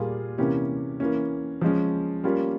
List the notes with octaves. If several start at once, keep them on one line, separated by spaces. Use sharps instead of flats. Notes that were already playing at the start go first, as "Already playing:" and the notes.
Already playing: A#2 G3 A#3 F4 G#4
C3 E3 A#3 C#4 G4
E3 A#3 C#4
F3 G#3 C#4
G3 A#3 C#4 F4